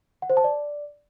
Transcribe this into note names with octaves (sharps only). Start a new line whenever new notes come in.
F#5
C5
A5
D5